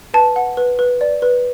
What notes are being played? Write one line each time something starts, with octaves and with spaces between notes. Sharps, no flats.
B4 A5
F#5
B4
B4
D5
B4